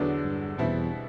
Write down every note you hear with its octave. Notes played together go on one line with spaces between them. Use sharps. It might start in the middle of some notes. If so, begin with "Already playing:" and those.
Already playing: E2 D3 F#3 B3 D4
G2
E2 B2 G3 C4 E4